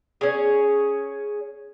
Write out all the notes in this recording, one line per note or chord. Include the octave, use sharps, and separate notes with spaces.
C#4 G#4